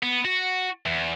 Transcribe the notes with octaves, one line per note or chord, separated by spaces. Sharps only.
B3
F#4
E2